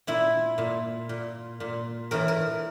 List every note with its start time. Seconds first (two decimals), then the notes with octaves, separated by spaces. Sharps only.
0.07 A#2 E4
0.58 A#2
1.09 A#2
1.60 A#2
2.11 A2 E3 A#4
2.28 A#4